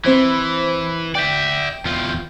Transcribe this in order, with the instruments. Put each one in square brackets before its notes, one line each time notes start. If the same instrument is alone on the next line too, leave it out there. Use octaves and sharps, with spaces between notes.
[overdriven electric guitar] E3 [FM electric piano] C4 C5 B5
[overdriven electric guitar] D5 E5 [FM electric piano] G5 G6
[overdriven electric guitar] E2 F4